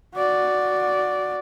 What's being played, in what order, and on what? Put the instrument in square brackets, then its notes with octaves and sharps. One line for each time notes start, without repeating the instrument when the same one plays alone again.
[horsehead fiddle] F#4 D5